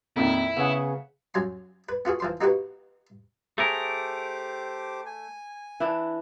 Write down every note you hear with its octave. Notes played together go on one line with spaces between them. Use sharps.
F2 A#2 D#3 E4
C#3 B3 C#4 G#4 E5 F#5
F#2 F#3 G#5 C6
B4
B3 F4 F#4 G#4
E3 F3 C6
A#3 D#4 F#4 G4 B4
A3 G4 G#4 A#4 C5 D6
G#5
E3 D4 E4